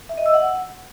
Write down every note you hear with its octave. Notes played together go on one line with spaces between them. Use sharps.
E5
D#5
E6
F#5